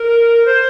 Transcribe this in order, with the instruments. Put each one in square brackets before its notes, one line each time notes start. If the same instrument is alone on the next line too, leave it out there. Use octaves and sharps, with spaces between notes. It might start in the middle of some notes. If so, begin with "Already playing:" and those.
Already playing: [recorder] A#4
C5